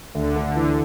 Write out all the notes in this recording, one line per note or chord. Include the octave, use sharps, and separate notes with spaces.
D2 D3
D2
D3
E3